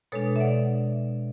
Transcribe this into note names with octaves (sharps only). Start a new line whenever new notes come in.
B2 G#3 D4 A4 C#5
E5
D5 F#5